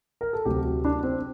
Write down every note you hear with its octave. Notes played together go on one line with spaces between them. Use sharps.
A#4
A4
D2 C3 F#3 G4
F#4
D4
C4